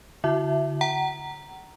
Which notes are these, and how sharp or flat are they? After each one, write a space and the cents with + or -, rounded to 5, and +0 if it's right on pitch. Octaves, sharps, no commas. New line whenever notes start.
D3 -30 E4 +25 E5 +0
F#5 +40 A#5 +0